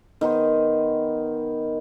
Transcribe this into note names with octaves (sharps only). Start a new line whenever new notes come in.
D#3 B3 D#4 C5